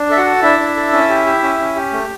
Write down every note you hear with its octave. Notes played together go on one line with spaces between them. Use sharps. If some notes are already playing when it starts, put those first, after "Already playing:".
Already playing: D4
A4 E5
F#4 F#5
A4
D4 E4 E5
D4
A4
C#4
G4
G4
C#4
C#4
G4
A3